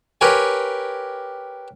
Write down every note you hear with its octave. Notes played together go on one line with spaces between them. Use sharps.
G4 A#4 B4 C#5 G5 G#5